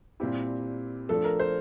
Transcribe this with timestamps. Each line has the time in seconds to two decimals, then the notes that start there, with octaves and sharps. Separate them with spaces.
0.20 A#2 G3 C4 E4 G4
1.09 F3 A3 D4 A4
1.24 A#4
1.39 C5